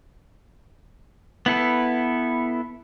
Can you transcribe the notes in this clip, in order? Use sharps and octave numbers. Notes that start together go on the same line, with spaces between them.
B3 E4 A4 B4